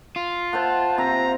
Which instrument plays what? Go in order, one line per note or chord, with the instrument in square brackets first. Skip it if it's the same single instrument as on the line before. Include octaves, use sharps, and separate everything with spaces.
[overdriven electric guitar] F4
[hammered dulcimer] C5 E5 F#5 [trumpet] A5
[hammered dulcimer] C3 C4 E5 [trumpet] A#5